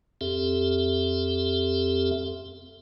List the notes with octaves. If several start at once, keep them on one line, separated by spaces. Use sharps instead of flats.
F2 C4 G4 A4 E5